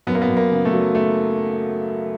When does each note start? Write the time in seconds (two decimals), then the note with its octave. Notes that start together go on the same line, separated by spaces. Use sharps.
0.07 F#2 B3
0.15 A#3
0.22 B3
0.29 F#2
0.37 A#3
0.52 C#3
0.65 A3
0.73 F#3
0.95 A3